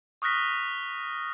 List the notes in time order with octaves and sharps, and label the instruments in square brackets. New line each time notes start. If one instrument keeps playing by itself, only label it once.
[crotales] C#6 D#6 F6 F#6 A#6 B6